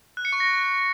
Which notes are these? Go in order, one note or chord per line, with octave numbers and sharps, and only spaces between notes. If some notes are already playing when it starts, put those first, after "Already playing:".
F#6
C#7
C#6
A#6